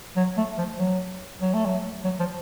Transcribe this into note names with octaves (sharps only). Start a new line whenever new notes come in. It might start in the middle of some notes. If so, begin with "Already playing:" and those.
F#3
A3
F3
F#3
F#3
A3
F#3
F#3
F3